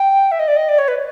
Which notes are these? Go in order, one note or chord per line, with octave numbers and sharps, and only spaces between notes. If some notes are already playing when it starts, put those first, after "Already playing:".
Already playing: G5
E5
D#5
D5
D#5
D5
C#5
B4